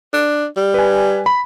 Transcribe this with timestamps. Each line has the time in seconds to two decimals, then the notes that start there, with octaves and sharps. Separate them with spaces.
0.14 D4
0.57 G3
0.74 B4 G#5
1.26 B5